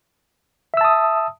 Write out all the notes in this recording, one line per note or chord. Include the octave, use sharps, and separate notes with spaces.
E5 A5 D#6 E6